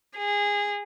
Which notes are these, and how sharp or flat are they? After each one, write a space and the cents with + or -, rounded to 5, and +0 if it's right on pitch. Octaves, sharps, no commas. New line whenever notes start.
G#4 -20